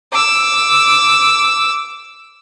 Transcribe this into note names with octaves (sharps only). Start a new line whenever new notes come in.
D6 E6